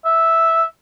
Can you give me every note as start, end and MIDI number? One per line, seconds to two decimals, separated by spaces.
0.05 0.64 76